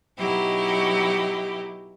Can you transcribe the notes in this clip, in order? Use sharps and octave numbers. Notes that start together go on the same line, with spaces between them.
B2 F#3 D#4 E4 G4